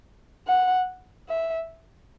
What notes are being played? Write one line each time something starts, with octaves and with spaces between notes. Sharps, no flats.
F#5
E5